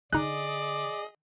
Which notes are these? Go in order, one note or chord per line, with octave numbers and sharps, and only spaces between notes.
D3 D#4 G#4 D5 D#5 F#6